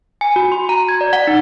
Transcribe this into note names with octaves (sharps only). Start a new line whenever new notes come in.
G#5
F#4
C6
A#5
G#6
D5
F#5
D#4